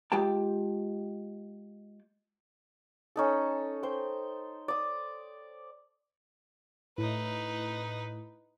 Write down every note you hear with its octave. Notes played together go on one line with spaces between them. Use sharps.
G#3 F4 G4 G5 A5
C#4 D#4 A4
C5 G5
D5 D#6
A2 D#4 E4 B4